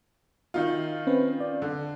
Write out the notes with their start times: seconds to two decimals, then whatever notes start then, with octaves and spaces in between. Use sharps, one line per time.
0.54 D#3 D#4 F4 E5
1.07 C4 C#4 B4
1.40 D5
1.62 D3